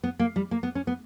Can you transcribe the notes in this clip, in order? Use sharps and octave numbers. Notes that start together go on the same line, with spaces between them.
B3
A#3
G3
A#3
B3
C#4
B3